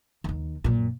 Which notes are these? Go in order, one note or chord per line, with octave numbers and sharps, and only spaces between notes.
D#2 D#3
F#2 A#2